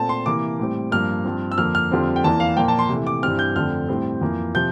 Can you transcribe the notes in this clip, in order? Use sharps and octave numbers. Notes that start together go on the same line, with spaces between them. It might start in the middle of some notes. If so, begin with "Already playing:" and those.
Already playing: A#2 A3 C4 A5
C6
C3 E3 A#3 D6
A2 G3 C4
G2 F3 A#3 F6
G2 F3 C4
E6
F2 D3 F3 A#3 F6
F6
F2 D3 G3 C4
G5
E2 E3 A#3 A5
F5
A#2 F3 A#3 G5
A5
C6
C3 E3 A3
D6
G2 E3 G3 C4 F6
G6
F2 D3 A3 C4 F6
A2 G3 C4
F2 E3 A#3
C3 F3 G6